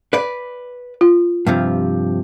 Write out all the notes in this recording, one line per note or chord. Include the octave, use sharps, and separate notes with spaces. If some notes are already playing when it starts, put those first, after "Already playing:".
B4 D5
F4
G2 C3 F3